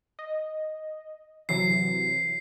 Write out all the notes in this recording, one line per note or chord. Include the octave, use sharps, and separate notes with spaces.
D#5
C3 E3 F#3 C7